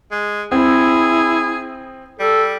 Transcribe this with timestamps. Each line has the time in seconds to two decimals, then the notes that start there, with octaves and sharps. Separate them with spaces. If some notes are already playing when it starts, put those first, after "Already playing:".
0.12 G#3
0.52 C4 E4 G#4
2.20 G3 A4